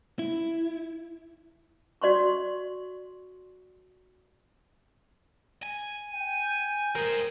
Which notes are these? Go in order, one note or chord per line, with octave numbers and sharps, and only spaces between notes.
E4
F#4 D5 C6 C#6
G#5
G5
G#4 A#4 C5